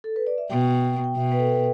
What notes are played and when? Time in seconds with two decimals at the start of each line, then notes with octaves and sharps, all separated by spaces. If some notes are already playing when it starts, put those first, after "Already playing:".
0.04 A4
0.16 B4
0.27 D5
0.38 E5
0.50 B2 G5
1.04 G5
1.16 B2 E5
1.32 B4
1.39 A4